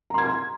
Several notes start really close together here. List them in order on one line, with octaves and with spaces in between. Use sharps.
A#5 C6 G#6